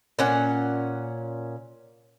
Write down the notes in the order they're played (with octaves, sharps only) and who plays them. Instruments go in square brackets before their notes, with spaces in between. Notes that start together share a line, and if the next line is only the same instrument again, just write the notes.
[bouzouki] A#2 C#4 F#5